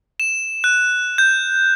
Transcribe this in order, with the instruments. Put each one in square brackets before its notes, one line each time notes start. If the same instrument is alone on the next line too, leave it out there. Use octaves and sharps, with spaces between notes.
[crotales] E7
F#6
G6